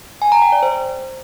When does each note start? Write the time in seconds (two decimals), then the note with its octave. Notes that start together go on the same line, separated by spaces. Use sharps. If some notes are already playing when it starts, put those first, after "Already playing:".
0.22 G#5
0.32 A#5
0.42 G5
0.52 D5
0.63 C5